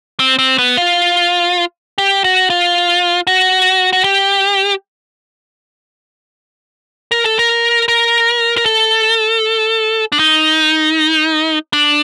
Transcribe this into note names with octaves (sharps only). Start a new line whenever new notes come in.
C4
C4
B3
F4
G4
F#4
F4
F#4
F#4
G4
A#4
A4
A#4
A#4
A#4
A4
D4
D#4
D4